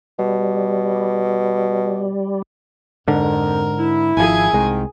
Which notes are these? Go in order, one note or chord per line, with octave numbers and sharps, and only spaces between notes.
B2 G3
F2 G#2 D3 A#4
E4
G#1 F3 G#4 G#5
C2 G#2 D#3 G#3